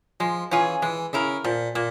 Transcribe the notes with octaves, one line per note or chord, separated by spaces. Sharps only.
F3 G#3
E3 C#4 F4 G#4
E3 G#3
C#3 E4 A#4
A#2 F3
A#2 A#3